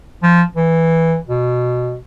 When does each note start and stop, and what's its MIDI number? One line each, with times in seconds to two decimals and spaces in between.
0.23 0.43 53
0.56 1.17 52
1.29 1.98 47